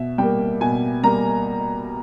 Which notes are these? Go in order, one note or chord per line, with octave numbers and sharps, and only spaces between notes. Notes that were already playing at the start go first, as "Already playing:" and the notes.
Already playing: B2 E5
G3 A#3 G5
B2 G#5
G3 A#3 A#5